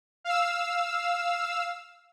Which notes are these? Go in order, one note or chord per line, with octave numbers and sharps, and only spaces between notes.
F5 E6